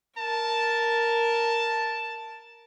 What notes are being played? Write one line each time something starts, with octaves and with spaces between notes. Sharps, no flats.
A#4 A5